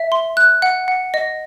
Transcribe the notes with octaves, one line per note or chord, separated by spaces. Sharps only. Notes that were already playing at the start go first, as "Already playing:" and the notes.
Already playing: E5
C6
F#6
F#5
F#5
D#5